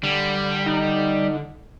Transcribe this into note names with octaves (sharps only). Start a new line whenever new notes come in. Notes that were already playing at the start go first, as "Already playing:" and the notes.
D3 G3
D#4